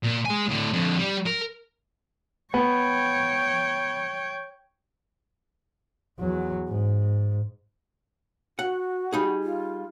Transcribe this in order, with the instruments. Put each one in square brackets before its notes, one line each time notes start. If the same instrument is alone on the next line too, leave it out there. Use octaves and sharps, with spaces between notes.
[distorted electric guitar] A#2
G#3 G#5
A2 D3
F2 D3
G3
A#4
[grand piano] B3 [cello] C#5 G5
[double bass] E2 F#3
G#2
[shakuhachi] F#4 [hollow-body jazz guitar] F#5
[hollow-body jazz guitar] G3 D#4 G#4
[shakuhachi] F4